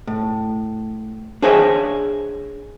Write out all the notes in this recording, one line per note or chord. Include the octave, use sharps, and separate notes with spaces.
A2
D4 G#4 C5 C#5 D#5 E5